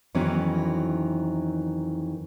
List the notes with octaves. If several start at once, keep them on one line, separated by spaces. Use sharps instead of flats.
F2 D#3 E3 F#3 B3 C#4